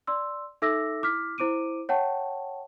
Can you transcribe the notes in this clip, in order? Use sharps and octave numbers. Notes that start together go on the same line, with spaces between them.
D5 C6 E6
D#4 A4 E5 D6 E6 A#6
E4 D6 F6 B6
E4 C5 D6 D7 D#7
C#5 F#5 G5 A5 C#6